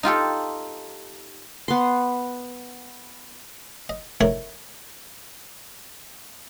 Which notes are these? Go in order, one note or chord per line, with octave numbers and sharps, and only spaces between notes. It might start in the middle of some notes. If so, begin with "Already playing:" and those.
D#4 F4 G4 A4
B3 C6
D#5
D#3 A3 D4 E4 A#4 C#5